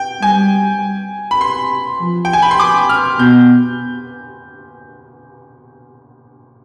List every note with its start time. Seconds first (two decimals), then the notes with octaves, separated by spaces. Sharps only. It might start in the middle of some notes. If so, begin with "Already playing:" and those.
Already playing: G5
0.22 G3 G#5
1.31 B5
1.41 C6
2.01 F3
2.25 G5
2.33 G#5
2.42 B5
2.51 C6
2.60 D6
2.89 F6
3.19 B2 G6